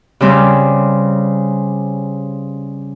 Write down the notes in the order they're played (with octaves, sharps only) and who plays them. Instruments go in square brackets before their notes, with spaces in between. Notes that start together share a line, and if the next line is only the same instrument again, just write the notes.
[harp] C#3 G3 C4